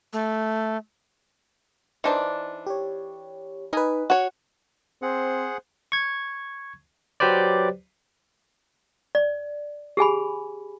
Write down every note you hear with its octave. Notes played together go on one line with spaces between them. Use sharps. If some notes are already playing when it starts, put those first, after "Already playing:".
A3
E3 D4 D#4 C5 D5
G4 C#5
D#4 A#4 B4 D#5 G#5
F#4 C#5 F#5
C4 G#4 C5 F#5
C#6 G#6
F#3 G4 B4 C5 D5
D5
G4 G#4 G#5 B5